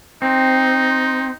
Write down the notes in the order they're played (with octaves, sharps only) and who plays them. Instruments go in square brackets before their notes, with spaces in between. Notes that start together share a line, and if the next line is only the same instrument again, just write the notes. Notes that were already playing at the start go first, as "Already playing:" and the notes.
[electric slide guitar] C4 [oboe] D#4